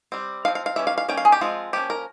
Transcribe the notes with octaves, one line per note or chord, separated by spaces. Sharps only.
G3 C4
F3 C4 F5
F5
F5
E3 G3 C#4 E5
F5
F5
G3 A#3 C#4 G5
F5
G#4
G4
F3 G#3 C4 F4
F3 A#3 C#4 G4
A#4